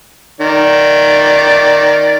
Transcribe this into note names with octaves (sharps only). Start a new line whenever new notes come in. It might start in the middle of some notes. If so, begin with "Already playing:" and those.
D#3 D5